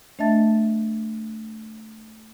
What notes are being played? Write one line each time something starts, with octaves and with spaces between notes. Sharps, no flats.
A3 D4 D#5 E5 A5 A6